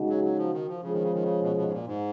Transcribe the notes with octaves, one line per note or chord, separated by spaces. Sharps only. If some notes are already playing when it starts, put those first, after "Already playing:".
Already playing: C#3 G#3 D#4 F#4
F#3
F#3
F3
D#3
F3
C#3 F3 G#3 C#4 G#4
D#3
C#3
D#3
C#3
B2
B2
G#2
A#2
G#2